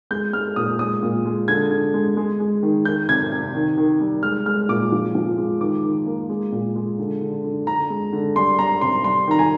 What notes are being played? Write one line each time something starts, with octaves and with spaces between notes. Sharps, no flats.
G#3 G6
G#3 F6
A#2 D#6
G#3 D#6
A#2
G#3
D3 G#6
D3
G#3
G#3
G#3
D#3
D#3 G6
C3 G#6
C3
D#3
D#3
G3
G#3 F6
G#3 F6
A#2 D6
F3
F3
G#3
D#3 D6
D#3
A#3
G#3
A#2
G#3
D3
D3
D3
D3 A#5
G#3
D3
G3 C6
G3 A#5
C3 C6
G3 C6
D#3 A#5
G#5